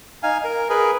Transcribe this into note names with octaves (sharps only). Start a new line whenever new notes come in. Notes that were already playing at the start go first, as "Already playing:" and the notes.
D#4 F5 G#5
A#4
G#4 A#4 B4